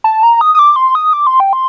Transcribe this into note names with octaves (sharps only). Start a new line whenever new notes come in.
A5
A#5
D#6
D#6
D6
C6
D#6
D6
C6
G5
C6